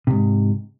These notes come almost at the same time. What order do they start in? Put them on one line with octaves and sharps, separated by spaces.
C3 E2 G#2